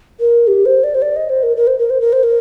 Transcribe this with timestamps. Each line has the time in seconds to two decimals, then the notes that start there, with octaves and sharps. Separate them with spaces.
0.20 A#4
0.47 G4
0.65 C5
0.84 D5
0.95 C5
1.02 D5
1.16 D#5
1.29 C5
1.43 A#4
1.57 A#4
1.67 C5
1.79 A#4
1.90 C5
2.01 A#4
2.13 C5
2.23 A#4